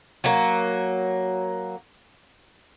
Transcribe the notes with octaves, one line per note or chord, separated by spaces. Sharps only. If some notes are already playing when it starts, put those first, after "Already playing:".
F#3 A#3